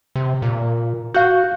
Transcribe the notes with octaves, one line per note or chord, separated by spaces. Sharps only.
C3
A#2
F#4 F5 F#6 G6